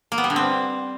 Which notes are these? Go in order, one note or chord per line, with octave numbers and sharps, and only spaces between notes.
A#3
B3
G3
D3
C4